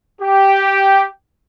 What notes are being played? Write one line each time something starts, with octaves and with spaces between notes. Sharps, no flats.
G4